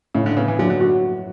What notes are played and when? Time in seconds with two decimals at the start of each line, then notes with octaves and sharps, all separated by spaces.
0.15 A2 C#3
0.26 D3
0.37 C#3 B3
0.48 E3
0.59 D3 F#3
0.70 D3
0.80 D3 F#4